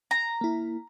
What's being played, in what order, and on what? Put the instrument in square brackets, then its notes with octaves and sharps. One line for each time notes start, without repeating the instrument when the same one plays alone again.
[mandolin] A#5
[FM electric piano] A#3 E4